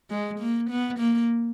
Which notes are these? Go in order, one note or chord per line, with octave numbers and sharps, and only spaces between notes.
G#3
A#3
B3
A#3